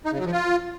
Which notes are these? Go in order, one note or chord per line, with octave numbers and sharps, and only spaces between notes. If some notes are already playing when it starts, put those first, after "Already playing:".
D#4
C#3
F#3
F3
F4